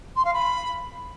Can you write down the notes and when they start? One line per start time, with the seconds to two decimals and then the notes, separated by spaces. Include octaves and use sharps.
0.16 C6
0.24 F5
0.33 B5